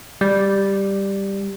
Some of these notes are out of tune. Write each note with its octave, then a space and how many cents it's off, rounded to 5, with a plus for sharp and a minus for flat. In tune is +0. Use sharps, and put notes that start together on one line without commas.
G3 +5